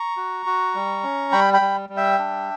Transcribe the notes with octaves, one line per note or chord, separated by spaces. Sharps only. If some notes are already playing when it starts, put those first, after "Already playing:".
Already playing: A#5 C#6
F#4
F#4
G3
C#4
G3 G5 B5
G5 B5
G3
G3
E5 G5
D4